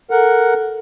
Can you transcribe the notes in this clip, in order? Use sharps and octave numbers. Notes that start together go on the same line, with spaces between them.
A4 A#4 F#5